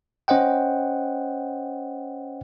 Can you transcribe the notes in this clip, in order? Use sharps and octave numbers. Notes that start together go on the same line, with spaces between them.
C#4 C5 D#5 F#5 G5